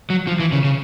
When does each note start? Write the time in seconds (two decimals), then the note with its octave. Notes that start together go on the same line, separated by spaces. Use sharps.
0.10 F#3
0.27 F3
0.40 E3
0.52 C#3
0.64 C#3